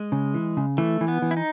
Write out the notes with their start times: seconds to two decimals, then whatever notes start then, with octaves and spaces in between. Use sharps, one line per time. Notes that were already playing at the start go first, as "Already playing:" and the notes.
Already playing: G#3
0.12 C#3
0.34 E3
0.57 C#3
0.78 E3 A3
1.01 E3
1.08 B3
1.22 E3
1.31 E4
1.37 D#4